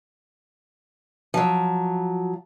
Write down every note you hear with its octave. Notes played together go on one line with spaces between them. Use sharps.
F3 F#3